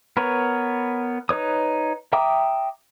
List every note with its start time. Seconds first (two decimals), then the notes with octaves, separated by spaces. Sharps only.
0.17 B3 A#4 B4 C#5
1.29 D#4 B4 C#5 D#6
2.13 E5 G5 A#5 D6 D#6